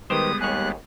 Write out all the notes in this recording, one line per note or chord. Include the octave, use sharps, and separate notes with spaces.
D#3 G3 G#3 B3 G4 B4 C5 D#6
D#2 G#4 C#5 F#6